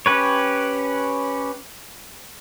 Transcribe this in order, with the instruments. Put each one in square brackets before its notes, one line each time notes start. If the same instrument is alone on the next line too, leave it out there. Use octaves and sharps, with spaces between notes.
[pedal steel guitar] C#4 G4 B4 C#5